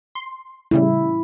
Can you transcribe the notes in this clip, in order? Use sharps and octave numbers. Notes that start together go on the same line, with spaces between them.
C6
A2 C#3 G3 E4